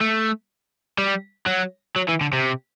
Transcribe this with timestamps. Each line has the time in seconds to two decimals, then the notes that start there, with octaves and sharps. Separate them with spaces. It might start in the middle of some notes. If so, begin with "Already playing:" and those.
0.01 A3
0.98 G3
1.47 F#3
1.96 F#3
2.09 E3
2.21 D3
2.33 C3